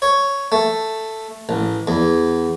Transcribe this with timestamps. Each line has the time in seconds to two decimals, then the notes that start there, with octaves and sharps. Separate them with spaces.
0.02 C#5
0.52 A3
1.49 A1
1.87 E2